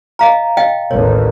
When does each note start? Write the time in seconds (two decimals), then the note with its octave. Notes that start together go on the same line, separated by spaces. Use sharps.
0.19 D#5 F5 A#5
0.57 D#5 F5 G5
0.91 A1 D#2 C#5